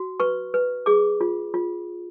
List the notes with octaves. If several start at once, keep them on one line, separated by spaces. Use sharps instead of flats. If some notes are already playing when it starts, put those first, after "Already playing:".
Already playing: F#4
B4 C#6
B4
G#4 D6
F4
F4